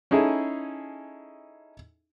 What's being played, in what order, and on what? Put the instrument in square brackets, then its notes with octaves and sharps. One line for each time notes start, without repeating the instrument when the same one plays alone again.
[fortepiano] C#4 D#4 E4 G#4 A4